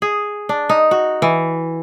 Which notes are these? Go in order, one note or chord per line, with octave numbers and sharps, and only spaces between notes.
G#4
D4
D#4
F#4
E3